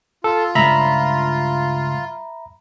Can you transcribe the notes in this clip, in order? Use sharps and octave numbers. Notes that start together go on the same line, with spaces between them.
F4 A4
C#2 G2 E5 A#5 B5